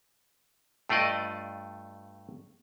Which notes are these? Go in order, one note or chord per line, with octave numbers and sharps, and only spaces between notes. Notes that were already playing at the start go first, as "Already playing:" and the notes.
G2 A3 F4 D5 D#5